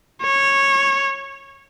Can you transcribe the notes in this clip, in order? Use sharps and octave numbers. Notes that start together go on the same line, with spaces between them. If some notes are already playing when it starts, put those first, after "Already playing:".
C#5